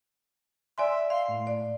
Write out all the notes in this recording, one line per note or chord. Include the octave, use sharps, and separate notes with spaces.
D5 E5 G#5 C6
F5 C6
A2
D5